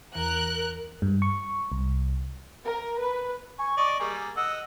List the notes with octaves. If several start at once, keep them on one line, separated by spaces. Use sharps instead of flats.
E2 E3 A#4 F#6
G2
C#6
C2
A#4
B4
G#5 C#6
D5 D#5 C#6
G3 A#3 G#4
D#5 F#5 E6